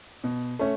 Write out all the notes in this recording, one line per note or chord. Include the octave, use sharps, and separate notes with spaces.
B2
A3 C#4